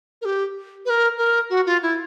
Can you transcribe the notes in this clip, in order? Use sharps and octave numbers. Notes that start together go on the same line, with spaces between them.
A#4
G4
B4
A#4
A#4
F#4
F4
E4